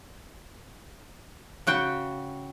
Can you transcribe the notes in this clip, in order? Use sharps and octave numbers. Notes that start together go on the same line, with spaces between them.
C#3 F#4 G5